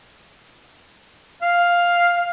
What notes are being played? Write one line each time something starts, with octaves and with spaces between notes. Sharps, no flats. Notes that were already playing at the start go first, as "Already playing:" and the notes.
F5